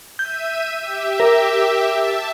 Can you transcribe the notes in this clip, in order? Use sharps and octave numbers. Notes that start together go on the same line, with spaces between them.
E5 G6 D#7
G4 E5
A#4
E5 A5